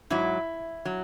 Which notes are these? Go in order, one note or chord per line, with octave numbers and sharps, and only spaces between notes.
G#2 F#3 E4
F#3